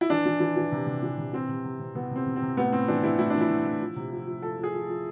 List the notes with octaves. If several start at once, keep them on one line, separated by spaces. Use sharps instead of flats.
E4
E3 D4
E3
E3
E3
C3
C3
E3
C3
E3 C4
C3
C3
C3
C3 B3
C3 C4
C3
C4
C3
A2 B3
A2 C4
E3 D4
E3 E4
A2 E4
E3 D4
E4
A2
A2
F3
C3
F3
F3
F3 A4
F3
G#4
F3
F3